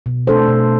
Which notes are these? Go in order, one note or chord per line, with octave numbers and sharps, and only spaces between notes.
B2
A3 D4 A4 C5
B2